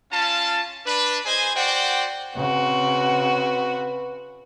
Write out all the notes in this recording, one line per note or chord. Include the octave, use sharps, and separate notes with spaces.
C#4 F4 F5 A5
D4 B4
G#4 C5 D#5 G#5
F#4 C5 D5 F#5 G5
C#3 C4 F#4 B4